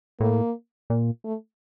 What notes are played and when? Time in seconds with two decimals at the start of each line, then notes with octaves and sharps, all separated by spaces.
0.20 A2 A#3
0.90 A#2
1.24 A3